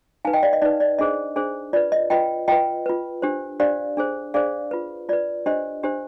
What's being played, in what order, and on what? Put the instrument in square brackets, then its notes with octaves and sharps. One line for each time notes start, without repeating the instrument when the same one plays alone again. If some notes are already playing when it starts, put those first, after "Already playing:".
[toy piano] D#4 B4 F5 G#5
D#5 G5
D5 F5
D#5
D#4 B4 D5
D5
D4 G#4 C5 D#5
D4 G#4 C5
F4 D5
B4
D#5
F4 B4 D#5 G5
F4 B4 D#5 G5
F4 B4
D4 G4 C5
D4 G4 C5 D5 F5
D4 G#4 C5
D4 G#4 C5 D5 F5
F4 B4
F4 B4 D5
D4 G4 C5 D#5
D4 G4 C5